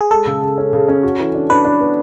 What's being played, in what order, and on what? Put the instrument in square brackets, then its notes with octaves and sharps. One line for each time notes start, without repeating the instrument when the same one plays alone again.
[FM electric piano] G#4
[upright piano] G#3 [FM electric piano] A4
[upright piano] C#3
C#3
C#4
C#3
C#4
F#4
E3
D4
[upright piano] D4 [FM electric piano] B4
[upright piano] D4
B3